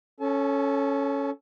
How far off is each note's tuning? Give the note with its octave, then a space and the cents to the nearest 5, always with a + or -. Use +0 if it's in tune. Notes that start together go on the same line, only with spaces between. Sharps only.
C#4 +0 A4 +0 A5 -45